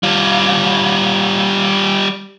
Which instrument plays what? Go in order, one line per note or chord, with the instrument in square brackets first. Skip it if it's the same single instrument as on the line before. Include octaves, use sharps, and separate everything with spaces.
[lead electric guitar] G3 F4